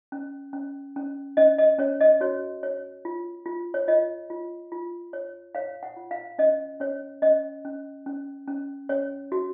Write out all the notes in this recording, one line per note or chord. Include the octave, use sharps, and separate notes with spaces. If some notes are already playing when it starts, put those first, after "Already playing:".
C#4
C#4
C#4
C#4 D#5
D#5
C#4 C#5
D#5
F#4 C#5
C#5
F4
F4
C#5
F4 D#5
F4
F4
C#5
C#5 F5
F#5
F4
F5
C#4 D#5
C#4 C#5
C#4 D#5
C#4
C#4
C#4
C#4 C#5
F#4